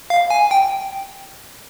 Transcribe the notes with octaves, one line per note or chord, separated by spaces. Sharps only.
F5
G#5
G5